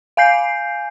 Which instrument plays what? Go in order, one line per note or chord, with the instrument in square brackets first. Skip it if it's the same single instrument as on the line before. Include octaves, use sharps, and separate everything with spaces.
[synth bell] F5 G#5 G6 C7